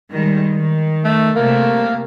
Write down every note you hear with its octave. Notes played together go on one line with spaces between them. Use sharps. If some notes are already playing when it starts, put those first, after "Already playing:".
D#3 G3 G#3
D#3
A3
C3 A3 A#3